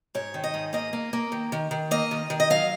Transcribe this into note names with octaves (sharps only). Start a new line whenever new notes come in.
G#2 C#5
D#3
D#5
G#2
A#3 D#5
A#3
A#3
D#3
D#3
D#3
A#3 D#5
D#3
D#3
D#5
F#3 F5